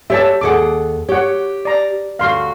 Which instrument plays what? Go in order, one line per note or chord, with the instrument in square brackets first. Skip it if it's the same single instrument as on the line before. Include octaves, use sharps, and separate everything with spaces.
[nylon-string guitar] G4 C#5 [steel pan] E5 A5
[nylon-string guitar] D#2 A4 F#5 [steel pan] G#4 D6
[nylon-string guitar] G4 [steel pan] C#5 F#5
[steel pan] D5 A#5
[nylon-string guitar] D2 F#4 [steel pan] F5 C6